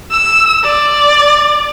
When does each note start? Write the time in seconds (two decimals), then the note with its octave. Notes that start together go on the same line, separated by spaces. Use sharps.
0.12 E6
0.64 D5